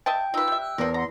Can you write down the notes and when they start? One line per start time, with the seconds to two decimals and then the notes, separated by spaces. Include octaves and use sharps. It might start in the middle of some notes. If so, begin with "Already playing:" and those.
0.06 D#5 E5 G5 A5
0.34 D#4 F4 B4 E6
0.48 G3 E5
0.60 E6 F#6
0.78 E2 F3 A#4
0.94 F#5 A#5 C6